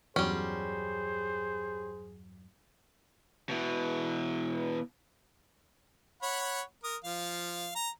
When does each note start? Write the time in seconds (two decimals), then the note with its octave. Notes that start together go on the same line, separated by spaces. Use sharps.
0.16 E2 G2 F#3 G3 C#4 G#4 C5
3.49 B2 E3
6.22 C#5 F#5 B5
6.84 A#4 D#6
7.04 F3 F5
7.75 A#5